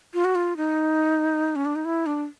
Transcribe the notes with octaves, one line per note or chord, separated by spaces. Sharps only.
F4
F#4
F4
D#4
C#4
D4
D#4
E4
D4